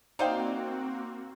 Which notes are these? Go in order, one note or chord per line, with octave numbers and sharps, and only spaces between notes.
A#3 C4 D#4 F#4 C5 D5 F5 G5